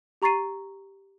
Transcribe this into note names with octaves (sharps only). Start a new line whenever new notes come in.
G4 A#5 C#6 A6 C7 D#7